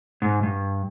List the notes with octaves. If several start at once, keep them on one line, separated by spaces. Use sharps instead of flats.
G#2
G2